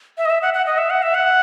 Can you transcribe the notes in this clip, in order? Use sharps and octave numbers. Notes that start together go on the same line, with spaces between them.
E5
D#5
E5
F#5
F#5
D#5
E5
F#5
E5
F#5